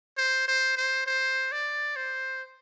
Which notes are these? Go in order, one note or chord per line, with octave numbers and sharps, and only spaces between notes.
C5
C5
C5
C5
D5
C5